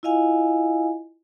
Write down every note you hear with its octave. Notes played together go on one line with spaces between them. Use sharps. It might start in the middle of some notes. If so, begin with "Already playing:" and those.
E4 F4 D#5 F5 G#5